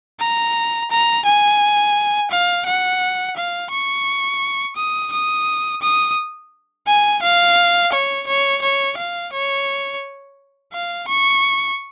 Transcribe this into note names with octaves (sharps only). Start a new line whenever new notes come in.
A#5
A#5
G#5
F5
F#5
F5
C#6
D#6
D#6
D#6
G#5
F5
C#5
C#5
C#5
F5
C#5
F5
C#6